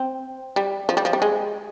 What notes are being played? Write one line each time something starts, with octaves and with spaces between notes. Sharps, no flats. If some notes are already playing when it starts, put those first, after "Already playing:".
Already playing: C4
G3
F3
G3
F3
G3
G#3